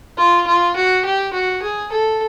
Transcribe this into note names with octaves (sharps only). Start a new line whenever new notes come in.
F4
F4
F#4
G4
F#4
G#4
A4